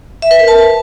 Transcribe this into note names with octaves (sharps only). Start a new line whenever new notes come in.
E5
B4
A#4
A5